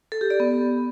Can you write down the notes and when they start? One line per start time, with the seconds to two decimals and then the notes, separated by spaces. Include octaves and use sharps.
0.12 A4
0.21 G4
0.30 D5
0.40 B3